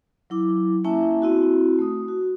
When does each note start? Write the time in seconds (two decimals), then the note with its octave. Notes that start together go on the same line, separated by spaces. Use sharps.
0.30 F#3 E4 D6
0.84 A#3 C#4 E4 E5 G#5 A5
1.22 C4 E4 F#4
1.79 A3 D#6
2.08 F#4